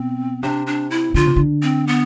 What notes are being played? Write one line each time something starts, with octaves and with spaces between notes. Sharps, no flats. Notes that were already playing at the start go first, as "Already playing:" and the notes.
Already playing: B2 C4
C3 D4
D4
E4
D3 F4
C3
D3
C4
B3